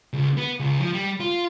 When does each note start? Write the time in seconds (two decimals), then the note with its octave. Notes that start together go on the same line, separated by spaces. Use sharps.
0.13 C#2
0.37 B3
0.60 C#2
0.79 F3
0.94 G3
1.21 F4